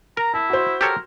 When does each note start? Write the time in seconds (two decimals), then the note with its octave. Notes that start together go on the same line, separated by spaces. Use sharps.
0.17 A#4 A#5
0.34 E4 A5
0.50 F#4 C5
0.81 G4 A4 A#4 C#5